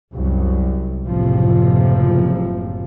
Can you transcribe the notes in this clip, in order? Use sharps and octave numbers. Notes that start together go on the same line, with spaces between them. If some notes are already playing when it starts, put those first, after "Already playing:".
C2 F#2
F#1 A2 C3 F3